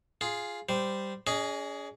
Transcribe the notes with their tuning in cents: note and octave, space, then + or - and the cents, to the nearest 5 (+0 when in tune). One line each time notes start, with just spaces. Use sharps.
F4 +0 G#4 +0
G3 +0 C5 -10
C#4 +45 G#4 +0 D#5 +0